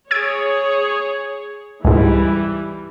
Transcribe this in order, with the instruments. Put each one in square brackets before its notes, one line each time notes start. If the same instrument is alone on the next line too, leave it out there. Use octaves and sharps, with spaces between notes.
[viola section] G#4 C#5 [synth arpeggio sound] E6 G#6 D7
[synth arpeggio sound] C#2 G#2 [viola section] E3 G3